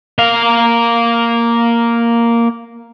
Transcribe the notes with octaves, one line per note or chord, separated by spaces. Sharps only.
A#3 F5